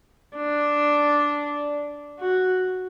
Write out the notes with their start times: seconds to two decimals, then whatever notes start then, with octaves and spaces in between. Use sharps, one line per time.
0.36 D4
2.20 F#4